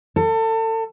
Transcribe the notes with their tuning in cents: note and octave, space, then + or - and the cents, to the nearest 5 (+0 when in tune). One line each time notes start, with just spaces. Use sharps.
A4 +30